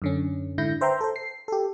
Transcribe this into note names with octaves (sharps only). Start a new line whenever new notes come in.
F#2 D3 C#4
G#2 D3 E4 G6 A#6
B4 C5 E5 G5 A#5 C6
A4 C5
C7
G4 A4